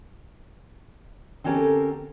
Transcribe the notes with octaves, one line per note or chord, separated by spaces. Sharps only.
D3 C4 C#4 G4 A4 A#4